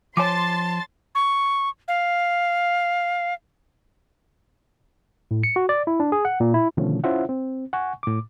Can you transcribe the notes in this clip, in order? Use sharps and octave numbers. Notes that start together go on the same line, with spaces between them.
F3 C5 C#5 G#5 A5 C6 D6 A6
C#6
F5
A2
C#7
F#4
D5
E4
D4
G#4
F#5
A#2
E4
B2 D3 D#3 F3 A3 C#4
C#4 E4 F4 C5 E5 F#5
C4
F#5 G#5 C#6
A2 D6